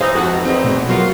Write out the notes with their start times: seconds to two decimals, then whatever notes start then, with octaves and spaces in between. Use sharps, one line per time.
0.01 E3 D#4 G#4 C5 F5
0.15 F2 G#2 F#4 A4 F#5 G5
0.32 F#3 B3 D#4
0.45 E2 C4 D#4 D#5
0.64 B2 A3 B3
0.89 F#3 B3 F4 F#4 A#4